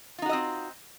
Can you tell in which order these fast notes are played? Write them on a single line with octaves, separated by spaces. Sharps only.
F4 D#4 F#4 D#5 C4